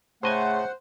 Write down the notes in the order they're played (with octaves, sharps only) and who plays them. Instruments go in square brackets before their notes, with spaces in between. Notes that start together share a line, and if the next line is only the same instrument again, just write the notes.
[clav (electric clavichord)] A2 D#5 G#5 [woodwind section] C#3 A3 [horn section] C5 [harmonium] F#5